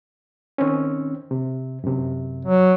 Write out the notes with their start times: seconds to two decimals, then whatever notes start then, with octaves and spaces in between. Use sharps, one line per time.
0.58 D#3 C4 C#4
1.31 C3
1.84 F#2 C3
2.45 F#3